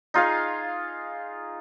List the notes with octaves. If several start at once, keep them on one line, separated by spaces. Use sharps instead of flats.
D#4 F4 G#4 F5